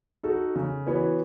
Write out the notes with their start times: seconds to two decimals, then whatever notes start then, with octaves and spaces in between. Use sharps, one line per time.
0.23 D#4 F#4 A4
0.56 C#3
0.87 E3 B3 F#4 C#5